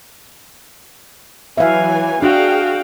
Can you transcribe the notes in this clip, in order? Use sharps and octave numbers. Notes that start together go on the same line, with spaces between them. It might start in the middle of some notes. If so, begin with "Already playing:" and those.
E3 F#3 E5 F5 G#5
D4 F#4 G#4 F5 G5